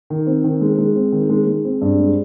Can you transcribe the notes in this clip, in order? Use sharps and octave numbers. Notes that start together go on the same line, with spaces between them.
D#3
C4
D#3
G#3
G#3
C4
D#3
G#3
G#3
C4
G2
G#3